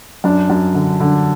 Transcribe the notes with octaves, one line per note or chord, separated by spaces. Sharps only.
F#2 D4
F#2
D3
D3